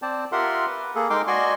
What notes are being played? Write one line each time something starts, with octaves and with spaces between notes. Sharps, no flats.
C4 C5 D5 A5
F4 G4 A#4 E5 F#5 C6
B4
A#3 G#4 A4
G#3 D#4 A#4 G5 C6 D6
F#4 D5 D#5 G#5 C6 C#6